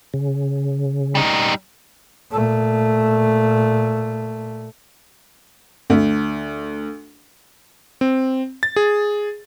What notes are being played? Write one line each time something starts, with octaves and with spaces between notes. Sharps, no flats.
C#3
G3 D#4
A#2 A3
D2
C4
A6
G#4